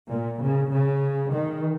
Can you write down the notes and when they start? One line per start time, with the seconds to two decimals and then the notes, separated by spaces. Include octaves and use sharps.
0.10 A#2
0.42 C#3
0.72 C#3
1.33 D#3